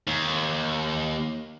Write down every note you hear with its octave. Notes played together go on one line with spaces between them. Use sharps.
D#2